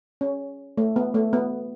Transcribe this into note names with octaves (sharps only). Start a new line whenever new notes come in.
C#4
A3
B3
A3
B3